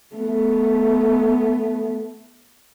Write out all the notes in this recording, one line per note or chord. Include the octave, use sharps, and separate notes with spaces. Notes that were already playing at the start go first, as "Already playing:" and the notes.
A3 B3